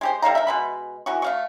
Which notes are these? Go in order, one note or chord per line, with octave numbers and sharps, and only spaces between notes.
G#3 G4 C5
G3 A4 F5 A#5
A#4 E5
B2 G#3 B5
E3 F#4 C#6
A3 F5 C#6